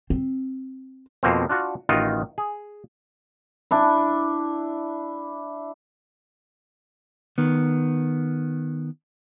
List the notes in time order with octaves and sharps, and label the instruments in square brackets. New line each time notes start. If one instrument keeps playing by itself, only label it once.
[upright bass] C4
[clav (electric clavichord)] F2 B2 A#3 C4
D4 F4 F#4
A1 D#3 D#4 F4 F#4
G#4
[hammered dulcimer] D4 E4
[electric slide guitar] D#3 B3